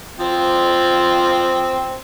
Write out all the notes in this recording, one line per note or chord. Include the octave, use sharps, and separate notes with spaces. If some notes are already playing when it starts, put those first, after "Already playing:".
F3 C4